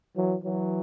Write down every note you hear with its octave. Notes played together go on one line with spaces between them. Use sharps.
E3 F#3
E3 F#3